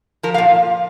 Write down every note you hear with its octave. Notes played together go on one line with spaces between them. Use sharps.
F3 A#4
F5
A#2